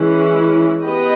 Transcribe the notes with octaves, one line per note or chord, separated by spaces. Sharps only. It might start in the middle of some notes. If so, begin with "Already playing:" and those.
Already playing: E3 G#3 C#4 E4
B3 G4 B4 D#5